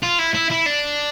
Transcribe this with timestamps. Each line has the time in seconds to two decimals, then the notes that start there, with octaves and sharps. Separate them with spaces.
0.03 F4
0.19 E4
0.34 E4
0.51 E4
0.66 D4